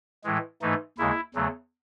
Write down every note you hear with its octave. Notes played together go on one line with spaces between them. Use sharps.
A2 E3 G#3
G#2 E3 A3 D#4
D#2 C#3 G#3 E4
E2 C#3 F#3 A3